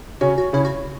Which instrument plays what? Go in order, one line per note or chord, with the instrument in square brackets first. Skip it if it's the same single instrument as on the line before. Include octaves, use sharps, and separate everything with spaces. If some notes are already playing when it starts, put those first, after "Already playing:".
[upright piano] C#3 C#4 [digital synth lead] F#4
[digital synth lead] F#4
[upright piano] C#3 C#4 [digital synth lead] E4
[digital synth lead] F#4